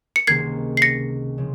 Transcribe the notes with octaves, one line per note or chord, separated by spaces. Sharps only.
C#7
C#2 C3 D#3 A#3 G#6 C7
C7
A#6 C#7
C#3 F3